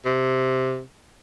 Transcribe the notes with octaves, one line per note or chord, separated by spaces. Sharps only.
C3